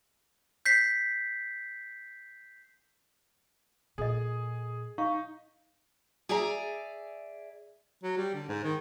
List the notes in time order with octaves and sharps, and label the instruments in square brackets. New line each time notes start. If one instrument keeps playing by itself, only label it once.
[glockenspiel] G6 B6 C7
[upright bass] A#2 [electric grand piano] G#4 [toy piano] A4 D#5
[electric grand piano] D#4 [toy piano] F5 C#6
[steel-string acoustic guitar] G#4 D5 E5 G#5 A#5
[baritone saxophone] F#3
G3
D3
G#2
D#3